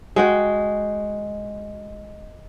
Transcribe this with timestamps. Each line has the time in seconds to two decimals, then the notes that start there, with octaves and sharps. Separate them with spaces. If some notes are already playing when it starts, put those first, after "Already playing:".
0.16 G#3 F#4 G5